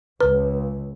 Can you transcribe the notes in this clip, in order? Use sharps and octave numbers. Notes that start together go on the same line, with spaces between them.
C#2 B4